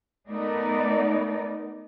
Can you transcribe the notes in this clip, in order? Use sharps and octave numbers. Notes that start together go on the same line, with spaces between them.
A3 B3 D#4 A#4 D5